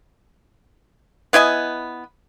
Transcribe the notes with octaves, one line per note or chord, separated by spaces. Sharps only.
B3 E4 D#5 G#5